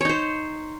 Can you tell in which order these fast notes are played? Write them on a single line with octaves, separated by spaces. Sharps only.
C#5 D#4 C5